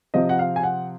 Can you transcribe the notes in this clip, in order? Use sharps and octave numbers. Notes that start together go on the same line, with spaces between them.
C3 F3 C4 D#5
F#5
F5
G#5
F#5